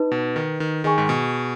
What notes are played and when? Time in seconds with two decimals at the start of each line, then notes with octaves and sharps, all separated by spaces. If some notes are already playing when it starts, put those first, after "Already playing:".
Already playing: D#4 B4 D#5
0.12 B2
0.36 D#3
0.60 D#3
0.84 D#3 G#4 D#5 G#5 C#6
0.98 G#2
1.09 B2